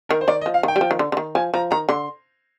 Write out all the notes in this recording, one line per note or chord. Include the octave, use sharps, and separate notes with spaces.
D#3 A#4
C5
D#3 D5
D#5
F3
F5
D#3 G5
G3
F3
D#3
D3
D3
D#3
F3 G#5
F3 A#5
D#3 A#5
D3 C6